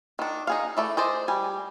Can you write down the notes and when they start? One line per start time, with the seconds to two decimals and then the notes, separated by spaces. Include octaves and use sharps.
0.19 D#3 D4
0.47 D#4 G#4 F5
0.77 E3 A3 D5
0.97 G#4 C5 D5 D#5
1.28 G3 G#5